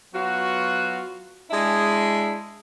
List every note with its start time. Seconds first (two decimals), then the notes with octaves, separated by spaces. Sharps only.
0.14 F#3 B3 F4 F#4
1.51 G#3 D4 E4 G#4